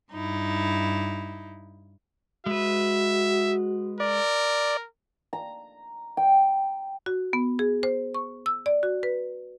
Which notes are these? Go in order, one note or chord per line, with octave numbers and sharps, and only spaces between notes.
G2 D#4 E4
G#3 F#4 B4 E5
A#4 D5
A#5
G5
F#4
B3
G#4
C5
C#6
E6
D5
F#4
B4